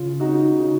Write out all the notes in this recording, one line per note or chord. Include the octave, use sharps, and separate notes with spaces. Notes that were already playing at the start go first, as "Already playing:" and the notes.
Already playing: C#3 F4
D#4 F#4
C#3